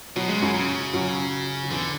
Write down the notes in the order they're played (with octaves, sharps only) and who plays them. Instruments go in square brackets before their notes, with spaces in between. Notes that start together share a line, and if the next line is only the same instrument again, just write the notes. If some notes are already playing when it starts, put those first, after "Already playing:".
[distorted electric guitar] B2 [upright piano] F#3
[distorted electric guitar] C#3 [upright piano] G#3
[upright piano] F#2 F#3 [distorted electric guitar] C#3
[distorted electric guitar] C#3
[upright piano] F#2 F#3
F#3
[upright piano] E2 E3 [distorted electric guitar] D3